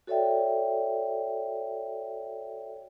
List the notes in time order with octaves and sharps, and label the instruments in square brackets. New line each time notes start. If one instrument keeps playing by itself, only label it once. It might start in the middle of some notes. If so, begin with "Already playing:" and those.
[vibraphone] F#4 A4 C#5 D5 E5 G5